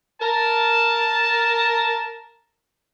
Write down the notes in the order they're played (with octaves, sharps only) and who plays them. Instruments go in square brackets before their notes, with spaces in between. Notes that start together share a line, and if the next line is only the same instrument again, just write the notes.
[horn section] A#4 A5